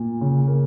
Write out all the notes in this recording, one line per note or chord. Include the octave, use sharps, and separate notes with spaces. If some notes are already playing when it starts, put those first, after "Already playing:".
Already playing: A#2
C#3
A#3